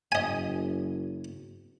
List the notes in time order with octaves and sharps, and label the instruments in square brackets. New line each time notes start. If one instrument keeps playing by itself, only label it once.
[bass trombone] F#1 [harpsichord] D#5 G#5